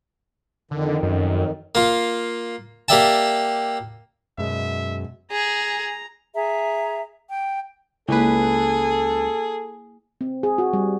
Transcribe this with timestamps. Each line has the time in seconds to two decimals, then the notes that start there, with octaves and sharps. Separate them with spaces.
0.71 F2 D3 D#3
1.03 F#2
1.75 A#3 F4
2.88 A#3 G4 D5 E5 G5 A5
4.38 F#2 B2 G#3 E5
5.32 G#4 A#5
6.35 G#4 E5 A#5
7.29 G5
8.09 C#2 A#3 E4 G#4 A4 B4
10.21 C4
10.43 G#4
10.58 F#4
10.73 G3